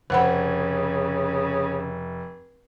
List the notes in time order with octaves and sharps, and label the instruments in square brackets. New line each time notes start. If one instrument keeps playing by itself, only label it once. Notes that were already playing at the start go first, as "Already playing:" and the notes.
[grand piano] F1 [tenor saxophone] C#3 [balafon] C5 F#5 B5